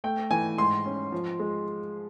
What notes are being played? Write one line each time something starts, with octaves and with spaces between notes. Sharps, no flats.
A3 G5
E3 G#5
G#2 C6
C#4
F3
G#3